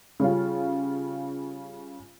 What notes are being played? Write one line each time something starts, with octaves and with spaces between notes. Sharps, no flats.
C#3 G3 C#4 F4